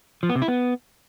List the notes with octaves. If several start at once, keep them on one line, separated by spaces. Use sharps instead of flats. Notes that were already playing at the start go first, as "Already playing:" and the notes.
F3
B3
C3
E4
B3